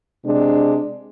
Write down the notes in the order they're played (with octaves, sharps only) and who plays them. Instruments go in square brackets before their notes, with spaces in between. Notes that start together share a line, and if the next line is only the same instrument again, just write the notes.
[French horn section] C3 G#3 D4